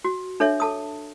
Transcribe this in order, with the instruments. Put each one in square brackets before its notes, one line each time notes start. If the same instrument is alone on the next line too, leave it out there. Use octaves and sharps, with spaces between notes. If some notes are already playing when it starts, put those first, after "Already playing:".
[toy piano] F#4
D4 A4 C#5 E5
A4 A5 D#6